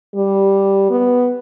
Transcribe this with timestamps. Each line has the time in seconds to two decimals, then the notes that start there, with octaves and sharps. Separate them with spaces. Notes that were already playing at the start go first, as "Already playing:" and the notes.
0.15 G3
0.90 B3